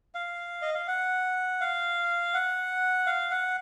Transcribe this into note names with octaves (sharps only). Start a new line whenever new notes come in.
F5
D#5
F5
F#5
F5
F#5
F5
F#5